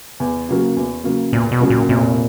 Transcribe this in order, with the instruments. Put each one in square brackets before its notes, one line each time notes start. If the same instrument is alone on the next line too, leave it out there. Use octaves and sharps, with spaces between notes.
[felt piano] E2
C#3 F#3 A#3
E2
C#3 F#3 A#3
[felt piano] E2 [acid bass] A#2
[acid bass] B2
[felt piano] C#3 F#3 A#3
[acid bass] A#2
[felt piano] F1 [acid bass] A#2